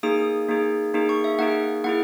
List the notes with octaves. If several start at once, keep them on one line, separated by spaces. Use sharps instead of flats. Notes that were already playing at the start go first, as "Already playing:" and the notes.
A#3 D#4 G#4 D#6
A#3 D#4 G#4
A#3 D#4 G#4
C#6
E5
A#3 D#4 G#4 F#5
A#3 E4 G#4 F#5